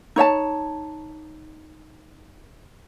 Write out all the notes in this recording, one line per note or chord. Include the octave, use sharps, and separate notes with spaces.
D#4 C#5 E5 A5